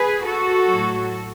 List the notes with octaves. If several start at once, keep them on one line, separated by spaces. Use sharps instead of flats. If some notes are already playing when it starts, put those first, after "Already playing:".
Already playing: G#4 B4
F#4 A4
F#3
A2